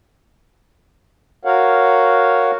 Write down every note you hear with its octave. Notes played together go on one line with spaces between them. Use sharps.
F#4 A#4 C#5 F5 F#5